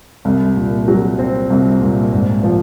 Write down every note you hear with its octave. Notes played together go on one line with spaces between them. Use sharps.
C2
A#2
F#3
C4
C2
A#2
G#2
F3